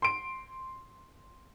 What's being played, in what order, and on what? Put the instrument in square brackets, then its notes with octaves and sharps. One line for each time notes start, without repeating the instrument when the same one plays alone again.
[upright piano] C6 D7